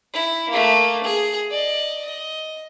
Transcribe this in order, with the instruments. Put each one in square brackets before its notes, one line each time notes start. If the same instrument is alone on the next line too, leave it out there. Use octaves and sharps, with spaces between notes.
[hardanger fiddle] E4
A3 A#3
G#4
D5 D#5
D#5